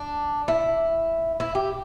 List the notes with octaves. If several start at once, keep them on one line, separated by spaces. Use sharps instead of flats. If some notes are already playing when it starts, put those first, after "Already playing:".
Already playing: D4
E4
E4
G4